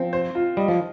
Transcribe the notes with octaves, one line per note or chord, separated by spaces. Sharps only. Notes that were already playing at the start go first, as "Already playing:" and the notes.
Already playing: F3 C4
C5
F4
G3 D#5
F3